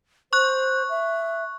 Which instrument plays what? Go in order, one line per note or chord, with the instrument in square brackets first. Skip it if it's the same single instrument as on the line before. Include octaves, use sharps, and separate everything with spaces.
[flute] C5 [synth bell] C#6 F#6
[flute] E5